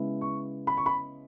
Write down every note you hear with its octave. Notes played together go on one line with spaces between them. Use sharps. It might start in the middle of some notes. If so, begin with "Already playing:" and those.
Already playing: C#3 G#3 B3 E4
C#6
B5
C#6
B5